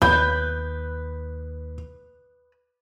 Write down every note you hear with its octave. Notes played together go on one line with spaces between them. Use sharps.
D#2 B4 G6